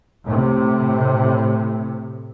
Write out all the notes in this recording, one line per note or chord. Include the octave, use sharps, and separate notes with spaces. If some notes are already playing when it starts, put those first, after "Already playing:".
A2 C3